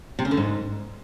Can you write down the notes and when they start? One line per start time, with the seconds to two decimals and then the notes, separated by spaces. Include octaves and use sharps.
0.19 C3
0.25 C#3
0.31 D3
0.37 G#2